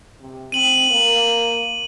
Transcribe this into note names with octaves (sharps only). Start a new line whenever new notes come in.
C3
C4 D#7 F#7
A#3 F#7